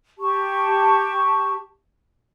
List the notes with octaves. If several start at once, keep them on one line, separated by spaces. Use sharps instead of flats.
G4 A5 C#6